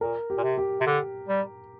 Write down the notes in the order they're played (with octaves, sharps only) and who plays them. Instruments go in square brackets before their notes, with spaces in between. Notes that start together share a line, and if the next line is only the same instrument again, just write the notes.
[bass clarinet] A#2 [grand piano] A#4
[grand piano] G4
[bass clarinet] A#2
C3
[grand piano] G4
[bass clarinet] C3
D3
G3